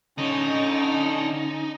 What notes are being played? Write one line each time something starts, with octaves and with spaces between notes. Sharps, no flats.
D3 C#4 D#4 C#5